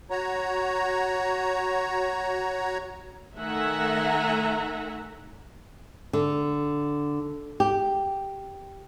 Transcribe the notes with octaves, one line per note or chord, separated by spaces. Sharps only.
F#4 C#5 A#5
D#3 A3 E5 F#5 G#5 A#5
D3
G4